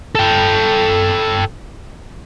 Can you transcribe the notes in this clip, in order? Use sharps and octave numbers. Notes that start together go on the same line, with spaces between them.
A4 G5